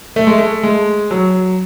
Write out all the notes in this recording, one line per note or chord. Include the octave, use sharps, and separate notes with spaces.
A3
G#3
A3
G#3
F#3